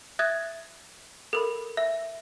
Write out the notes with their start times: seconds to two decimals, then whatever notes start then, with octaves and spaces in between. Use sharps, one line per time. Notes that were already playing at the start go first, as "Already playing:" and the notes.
0.19 E5 D#6 F#6 G#6 A6
1.33 A4 A#4 B5
1.77 E5